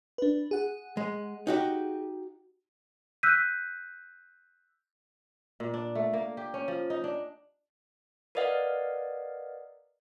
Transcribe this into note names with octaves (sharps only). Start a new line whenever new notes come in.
D4 B4
G#4 F#5
G#3
D#4 F#4 G4
E6 F#6 G6 B6 D#7
A#2
D4
A3
A#3
G4
C#4
F3
D#4
D4
A#4 B4 D5 D#5 F5 F#5